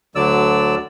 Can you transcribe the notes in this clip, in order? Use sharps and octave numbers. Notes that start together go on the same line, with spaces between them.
D2 D3 F#3 D5 E6